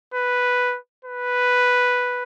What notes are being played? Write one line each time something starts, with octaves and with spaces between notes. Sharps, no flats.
B4
B4